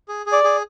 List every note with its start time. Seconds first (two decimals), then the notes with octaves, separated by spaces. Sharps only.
0.08 G#4
0.26 G#4
0.32 D5
0.44 G#4